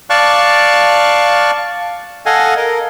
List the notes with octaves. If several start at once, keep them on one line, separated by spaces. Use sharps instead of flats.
D5 F5 A5 C#6 F#6
A4 D#5 F5 F#5 G#5
A#4 D#5